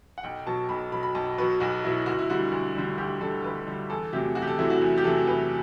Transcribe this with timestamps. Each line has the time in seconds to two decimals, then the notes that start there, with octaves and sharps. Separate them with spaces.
0.18 F#5
0.23 B1 G5
0.46 B2 F#3 A5
0.69 B1 B5
0.92 B2 F#3 B5
1.03 B5
1.15 B1 A5
1.38 B2 F#3 B4
1.60 B1 F#4
1.84 B2 F#3 E4
2.06 D2 F#4
2.19 E4
2.30 D3 G3 F#4
2.52 D2
2.76 D3 G3
2.98 D2 G4
3.21 D3 G3 A4
3.44 D2 B4
3.67 D3 G3
3.90 E2 A4
4.13 C3 F#3 A3 G4
4.35 E2 F#4
4.42 G4
4.47 A4
4.58 C3 F#3 A3 E4
4.70 F#4
4.82 E2
4.98 G4
5.04 C3 F#3 A3 A4
5.27 E2 B4